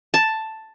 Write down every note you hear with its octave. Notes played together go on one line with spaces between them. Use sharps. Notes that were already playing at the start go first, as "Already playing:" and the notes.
A5